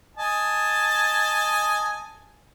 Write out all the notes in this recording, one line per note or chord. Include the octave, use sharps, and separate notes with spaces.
D#5 G#5 A5